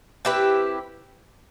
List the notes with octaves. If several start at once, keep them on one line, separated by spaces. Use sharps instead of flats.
C4 E4 G4 B4